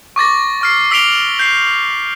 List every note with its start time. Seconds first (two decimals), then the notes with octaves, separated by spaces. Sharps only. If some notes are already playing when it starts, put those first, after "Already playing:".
0.16 C#6 D6 A6 A#6
0.61 C#6 F6 C7
0.91 E6 B6 D7 F7 G7
1.39 G6 C7